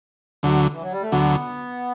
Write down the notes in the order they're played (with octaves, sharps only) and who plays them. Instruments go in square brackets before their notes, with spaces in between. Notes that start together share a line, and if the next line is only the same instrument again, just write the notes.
[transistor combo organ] D2 D3 F#3
[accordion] E3
F#3
G3
A3
[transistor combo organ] D2 D3 F#3 [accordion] B3